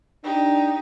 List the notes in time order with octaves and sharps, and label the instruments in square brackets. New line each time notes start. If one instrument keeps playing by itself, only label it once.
[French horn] D4 [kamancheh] D#4 G4